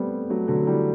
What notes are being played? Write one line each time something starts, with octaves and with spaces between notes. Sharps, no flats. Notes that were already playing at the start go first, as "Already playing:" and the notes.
Already playing: G3 A3 B3 C4
F#3 A3
D3 F#3
E3 G3